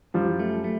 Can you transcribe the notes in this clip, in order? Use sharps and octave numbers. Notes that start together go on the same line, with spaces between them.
F#2 F3 G3
A3
A3